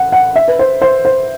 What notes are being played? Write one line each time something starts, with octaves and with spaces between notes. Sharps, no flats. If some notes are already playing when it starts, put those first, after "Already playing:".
Already playing: F#5
F#5
E5
B4
C5
C5
C5